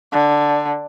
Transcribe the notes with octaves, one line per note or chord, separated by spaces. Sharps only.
D3